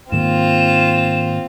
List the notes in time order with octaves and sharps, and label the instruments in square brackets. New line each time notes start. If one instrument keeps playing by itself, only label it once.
[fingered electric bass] G#2 D#3 A#3 [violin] C4 F4 [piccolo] E7